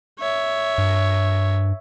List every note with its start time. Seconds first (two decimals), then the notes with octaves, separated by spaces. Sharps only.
0.19 C#5 E5
0.78 G2